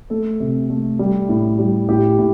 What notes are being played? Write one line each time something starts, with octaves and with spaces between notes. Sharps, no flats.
A3 A4
C3
A3
G3
A2
G3
A2 G4
A2